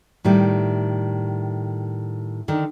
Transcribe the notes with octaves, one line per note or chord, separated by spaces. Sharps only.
A2 D#3 G3
D3 D#3